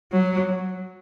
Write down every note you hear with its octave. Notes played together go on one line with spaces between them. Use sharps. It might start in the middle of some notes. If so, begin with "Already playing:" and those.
F#3